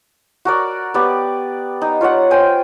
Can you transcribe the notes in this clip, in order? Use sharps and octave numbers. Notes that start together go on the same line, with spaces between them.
F#4 A#4 D5
B3 G4 D5
D#4
F4 C#5 D5 F#5
C5 G5 G#5